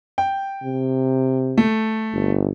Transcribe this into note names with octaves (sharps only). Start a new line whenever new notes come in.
G5
C3
A3
G1